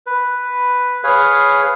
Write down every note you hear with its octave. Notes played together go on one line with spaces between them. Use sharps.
B4
G#4 B4 C#5 F5